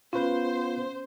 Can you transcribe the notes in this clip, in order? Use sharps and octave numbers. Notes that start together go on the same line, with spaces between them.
B3 C#4 F4 B4 C5